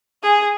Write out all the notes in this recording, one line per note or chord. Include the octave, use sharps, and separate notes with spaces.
G#4